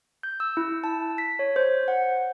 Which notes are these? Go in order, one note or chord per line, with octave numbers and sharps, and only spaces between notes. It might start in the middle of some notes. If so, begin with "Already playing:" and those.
G6
E6
E4
A5
B6
C#5
C5
F#5